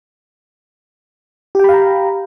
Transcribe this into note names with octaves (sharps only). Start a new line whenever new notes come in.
G4 F5 G5 A#5 B5